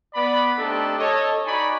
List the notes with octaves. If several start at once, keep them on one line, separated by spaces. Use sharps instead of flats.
B3 D5 B5
A3 C4 D4 D#4 G4 A4
A4 C#5 D#5
D#4 F#4 D5 G#5 B5 C#6